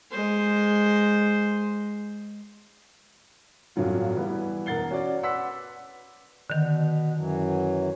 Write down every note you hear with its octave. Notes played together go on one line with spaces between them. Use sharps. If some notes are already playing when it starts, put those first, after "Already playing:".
G#3 C5
D1 G2 F#3 F4
E3 G3 B3
E1 A#4 F#5 A6 C7 G7
C#4 F#4 D5
B4 F#5 C6 D6 E6 B6
B2 D3 D#3
F#2 E3 F#3